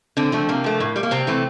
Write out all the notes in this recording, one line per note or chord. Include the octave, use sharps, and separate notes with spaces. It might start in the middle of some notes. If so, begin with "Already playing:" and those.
D3 C4
F3 A3
C3 A#3
F3 A3
A2
G3
A#3
C3 C4
E3 A3